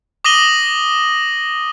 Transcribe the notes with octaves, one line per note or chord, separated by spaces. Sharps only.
D6 D#6 A#6 D#7 F#7 G7